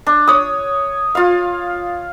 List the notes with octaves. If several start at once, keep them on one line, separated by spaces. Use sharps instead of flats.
D4
C#5 D#6
F4 F5